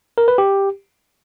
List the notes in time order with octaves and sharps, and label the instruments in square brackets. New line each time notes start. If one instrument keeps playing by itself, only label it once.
[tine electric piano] A#4
B4
G4